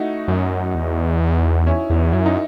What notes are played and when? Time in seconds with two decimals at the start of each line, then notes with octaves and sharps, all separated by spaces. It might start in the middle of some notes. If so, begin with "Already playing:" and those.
Already playing: A3 D#4 E4 F#4
0.28 F#2
0.75 E2
1.67 C#4 E4
1.90 E2
2.13 F#2 E4
2.26 D#4